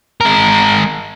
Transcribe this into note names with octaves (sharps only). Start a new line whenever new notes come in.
G#3 A#4